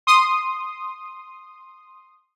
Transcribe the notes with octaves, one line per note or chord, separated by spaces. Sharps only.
C6 D#6